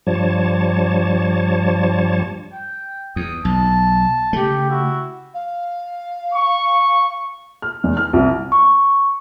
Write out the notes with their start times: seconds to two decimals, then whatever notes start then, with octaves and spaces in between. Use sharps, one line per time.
0.07 G2 F3 G3 C#5 A5
2.52 G5
3.16 E2 D#6
3.45 B1 A5
4.33 C#3 A3 G4
4.70 E4 F#4
5.34 F5
6.33 C#6
7.62 F6
7.84 E2
7.97 F6
8.13 C2
8.52 C#6